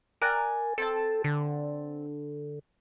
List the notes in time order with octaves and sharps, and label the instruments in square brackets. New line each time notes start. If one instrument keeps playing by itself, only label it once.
[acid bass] A#4 [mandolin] D5 G#5 F#6
[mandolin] C4 A5 [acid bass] A4
[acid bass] D3